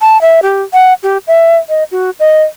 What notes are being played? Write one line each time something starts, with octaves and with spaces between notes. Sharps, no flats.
A5
E5
G4
F#5
G4
E5
D#5
F#4
D#5